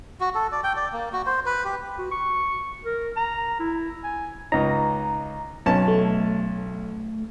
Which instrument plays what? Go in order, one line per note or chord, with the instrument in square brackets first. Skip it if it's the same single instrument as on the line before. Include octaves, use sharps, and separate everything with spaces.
[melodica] F#4
A4
D5
G5
D5
A#3
F#4
C5
B4
G4
[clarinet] F#4
C#6
A#4
A#5
E4
G#5
[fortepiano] C#2 D#4 [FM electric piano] A#5
[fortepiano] B1 C#4 A5
[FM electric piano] A3